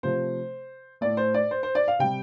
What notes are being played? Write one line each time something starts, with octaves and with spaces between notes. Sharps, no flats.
C3 F3 A3 C5
A2 A3 D5
C5
D5
C5
C5
D5
F5
C3 G3 G5